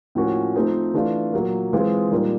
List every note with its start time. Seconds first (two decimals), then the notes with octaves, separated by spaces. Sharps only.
0.15 A2 F3 A#3 C#4 F#4
0.56 F3 A3 C4 D#4
0.94 E3 A3 D4 F4
1.33 A#2 F#3 A#3
1.73 E3 G#3 C4 F4 G#4
2.11 A#2 G3 A#3 D#4